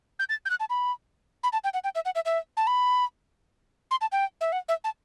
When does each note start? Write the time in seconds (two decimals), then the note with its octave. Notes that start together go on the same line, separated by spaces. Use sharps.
0.19 G6
0.29 A6
0.45 G6
0.50 F#6
0.60 A5
0.70 B5
1.43 B5
1.53 A5
1.64 G5
1.74 F#5
1.84 G5
1.95 E5
2.05 F#5
2.15 E5
2.25 E5
2.57 A5
2.67 B5
3.91 C6
4.01 A5
4.12 G5
4.41 E5
4.52 F#5
4.68 E5
4.84 A5